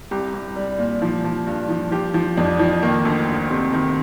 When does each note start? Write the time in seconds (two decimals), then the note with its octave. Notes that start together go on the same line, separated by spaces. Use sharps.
0.11 C2 G4
0.34 C2
0.56 G3
0.79 A#2
1.02 F3
1.24 F3
1.47 G2
1.69 F3
1.92 F3 G4
2.14 F3
2.37 F2 D4
2.59 F3
2.83 D#3 A#3
3.05 D2
3.29 D2
3.51 C3
3.73 D#3